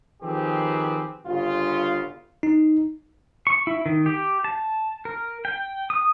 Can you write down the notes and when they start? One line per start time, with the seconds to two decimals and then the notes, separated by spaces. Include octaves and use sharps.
0.22 D#3 F3 C4 G4 G#4 B4
1.26 G1 G2 C#3 F4
2.43 D#4
3.47 C#6
3.67 E4
3.86 D#3
4.06 G4
4.44 A5
5.05 A#4
5.45 G5
5.90 D#6